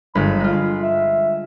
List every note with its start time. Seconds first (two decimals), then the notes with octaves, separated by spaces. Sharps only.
0.15 G1 G#3 B5
0.40 G#3 F4
0.82 E5